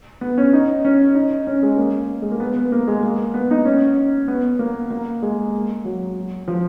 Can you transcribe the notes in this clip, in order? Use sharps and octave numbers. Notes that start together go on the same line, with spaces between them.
B3
C#4
D#4
C#4
D#4
C#4
G#3
A#3
G#3
A#3
B3
B3
A#3
G#3
A#3
B3
D#4
C#4
B3
A#3
A#3
G#3
F#3
F3